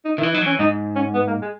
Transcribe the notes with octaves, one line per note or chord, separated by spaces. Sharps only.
D#4
D#3 E4
E3
F#3 D#4
E3 C#4
G#2 D#4
C#4
B3
A#3
G#3